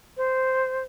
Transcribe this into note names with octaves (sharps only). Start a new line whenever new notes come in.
C5